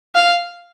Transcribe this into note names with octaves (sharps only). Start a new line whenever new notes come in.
F5